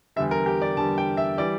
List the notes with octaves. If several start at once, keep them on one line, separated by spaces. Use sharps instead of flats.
E2 D3 G3 E5
A#4
G4
D5
E2 D3 G3 A5
G5
E5
E3 G3 D5